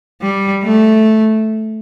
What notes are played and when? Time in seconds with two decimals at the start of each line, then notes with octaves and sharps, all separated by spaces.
0.22 G3
0.63 A3